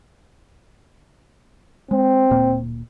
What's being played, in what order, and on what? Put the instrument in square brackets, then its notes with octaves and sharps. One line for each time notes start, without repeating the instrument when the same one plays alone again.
[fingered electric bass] G#3 [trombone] C4
[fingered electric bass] D1 A#2 A#3